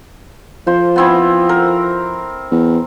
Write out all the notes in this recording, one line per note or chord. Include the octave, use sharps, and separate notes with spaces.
F3 C5
B3 C4 E4
A#4
E2